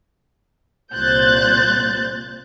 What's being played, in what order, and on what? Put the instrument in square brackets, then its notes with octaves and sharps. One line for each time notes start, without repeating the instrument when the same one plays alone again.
[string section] C2 A#2 C5 F#6 G6 A6